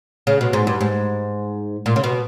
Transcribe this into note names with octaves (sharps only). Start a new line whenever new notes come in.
C#3
B2
G#2
G2
G#2
A#2
C#3
B2